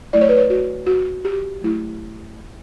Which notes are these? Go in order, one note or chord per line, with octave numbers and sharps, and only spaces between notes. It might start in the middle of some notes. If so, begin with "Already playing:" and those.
F#3 A3 E4 D5
C#5
B4
C#5
F#4
F#4
G4
F#3 A3 E4